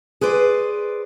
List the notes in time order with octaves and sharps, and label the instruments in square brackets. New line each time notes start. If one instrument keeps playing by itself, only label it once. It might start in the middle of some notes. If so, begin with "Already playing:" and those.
[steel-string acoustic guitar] G#4 B4 C5 D5